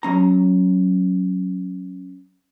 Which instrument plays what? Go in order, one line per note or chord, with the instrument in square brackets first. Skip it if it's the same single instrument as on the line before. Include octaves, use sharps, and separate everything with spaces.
[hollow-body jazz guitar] F#3 C#4 A#5